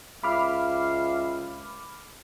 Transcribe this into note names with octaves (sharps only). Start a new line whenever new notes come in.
C#2 E5 F5 B5 D6 F6